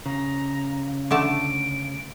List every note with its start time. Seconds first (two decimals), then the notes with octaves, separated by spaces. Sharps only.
0.06 C#3 A#5
1.11 D3 A3 A5 D7